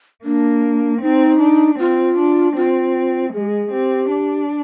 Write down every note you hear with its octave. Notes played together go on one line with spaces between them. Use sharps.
A#3 D4
C4 D#4
D4
C4 F4
D4
C4 F4
G#3 G#4
G4
G#4
C4 G4
D4